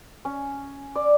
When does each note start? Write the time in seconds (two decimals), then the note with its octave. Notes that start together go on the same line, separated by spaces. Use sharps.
0.25 C#4
0.96 D5